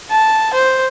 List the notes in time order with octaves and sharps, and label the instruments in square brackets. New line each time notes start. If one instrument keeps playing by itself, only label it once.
[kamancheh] A5
C5